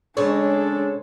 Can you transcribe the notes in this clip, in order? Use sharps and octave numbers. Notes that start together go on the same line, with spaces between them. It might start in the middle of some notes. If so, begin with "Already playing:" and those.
C#3 G#3 D4 A4 C5 C#5